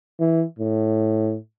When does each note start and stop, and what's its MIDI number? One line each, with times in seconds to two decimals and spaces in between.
0.20 0.44 52
0.59 1.37 45